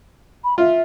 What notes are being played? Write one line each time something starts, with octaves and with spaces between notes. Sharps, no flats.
B5
F4 E5